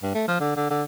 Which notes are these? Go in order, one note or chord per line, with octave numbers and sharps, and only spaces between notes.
G2
A3
F3
D3
D3
D3